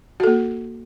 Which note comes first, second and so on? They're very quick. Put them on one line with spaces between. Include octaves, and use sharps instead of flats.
F#4 A4 A#3